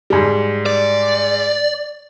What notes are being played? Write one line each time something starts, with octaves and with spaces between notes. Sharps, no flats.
G#2 G3
D5